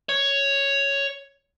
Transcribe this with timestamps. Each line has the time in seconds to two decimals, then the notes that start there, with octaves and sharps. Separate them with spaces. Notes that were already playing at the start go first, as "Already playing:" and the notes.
0.09 C#5